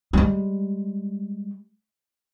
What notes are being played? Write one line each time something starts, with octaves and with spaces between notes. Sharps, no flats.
G3 G#3